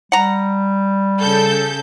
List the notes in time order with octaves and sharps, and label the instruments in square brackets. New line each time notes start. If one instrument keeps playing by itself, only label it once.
[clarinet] G3 [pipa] F#5 A#5
[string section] C#3 A4 G6